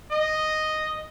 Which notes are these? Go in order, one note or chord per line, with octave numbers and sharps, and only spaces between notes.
D#5